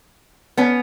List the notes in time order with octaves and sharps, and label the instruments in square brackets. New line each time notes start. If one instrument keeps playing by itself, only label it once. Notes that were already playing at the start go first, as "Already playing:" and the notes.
[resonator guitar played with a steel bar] B3 C#4